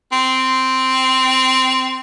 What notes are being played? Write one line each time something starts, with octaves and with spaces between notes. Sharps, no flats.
C4